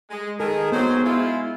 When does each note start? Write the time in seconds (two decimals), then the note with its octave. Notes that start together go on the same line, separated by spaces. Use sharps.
0.11 G#3
0.40 D#3 G#4 A4
0.72 G#2 F#3 B3 C5
1.05 G#3 E4 F4